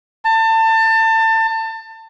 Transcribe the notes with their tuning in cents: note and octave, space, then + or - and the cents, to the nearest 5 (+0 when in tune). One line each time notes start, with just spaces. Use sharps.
A5 +30